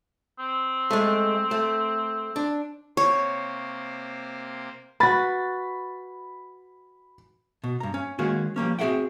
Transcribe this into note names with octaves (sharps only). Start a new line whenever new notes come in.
C4
G#3 A3
A3
D4
C3 A#3 C5 C#5
F#4 B4 B5 A6
B2
G2 A#5
C#4
D#3 G#3 A#3 C#4 F#4 G#4
F3 G3 A#3 C#4
C4 F#4 G#4 E5 F#5 G5